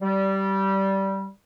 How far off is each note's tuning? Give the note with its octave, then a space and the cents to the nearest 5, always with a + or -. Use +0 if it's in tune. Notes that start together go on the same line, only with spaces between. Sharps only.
G3 -15